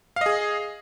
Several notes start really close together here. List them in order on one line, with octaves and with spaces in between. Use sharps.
F5 D#5 G#4